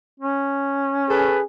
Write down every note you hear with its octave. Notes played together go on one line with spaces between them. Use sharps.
C#4
G#4 A4 B4